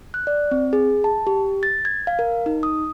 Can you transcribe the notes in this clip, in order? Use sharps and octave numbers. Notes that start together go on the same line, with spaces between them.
F#6
D5
C4
G#4
A5
G4
A6
G#6
F5
A#4
D#4
D#6